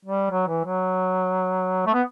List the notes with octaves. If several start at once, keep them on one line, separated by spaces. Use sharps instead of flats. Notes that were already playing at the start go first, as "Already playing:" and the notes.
G3
F#3
E3
F#3
A3
B3